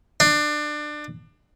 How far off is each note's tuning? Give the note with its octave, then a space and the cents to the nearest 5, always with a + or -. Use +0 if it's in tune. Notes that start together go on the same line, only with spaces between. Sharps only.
D4 +25